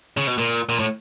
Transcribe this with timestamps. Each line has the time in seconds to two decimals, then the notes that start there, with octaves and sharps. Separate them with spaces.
0.17 C#3
0.27 B2
0.38 A#2
0.69 A#2
0.79 A2